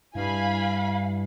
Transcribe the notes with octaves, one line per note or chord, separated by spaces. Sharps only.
G2 E4 F5 G#5 B5